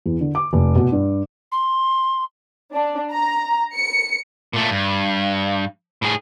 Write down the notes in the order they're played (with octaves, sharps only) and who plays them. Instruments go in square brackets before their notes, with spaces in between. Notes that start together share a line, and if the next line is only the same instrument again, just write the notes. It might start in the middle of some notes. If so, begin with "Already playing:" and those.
[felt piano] E2
D3
D6
F1
B2
G2
[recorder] C6
[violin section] D4
A#5
C#7
[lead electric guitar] A#2 A3
G2
A2 G#4